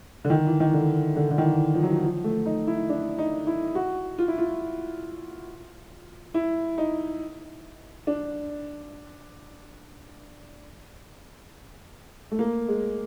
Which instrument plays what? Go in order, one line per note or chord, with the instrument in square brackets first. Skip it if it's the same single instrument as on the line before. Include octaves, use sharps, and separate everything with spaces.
[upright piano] D3
D#3
E3
D#3
D3
D3
D3
D#3
E3
F3
F#3
F3
F3
A3
D#4
E4
D4
D#4
E4
F#4
F4
E4
F4
E4
D#4
D4
A3
A#3
G#3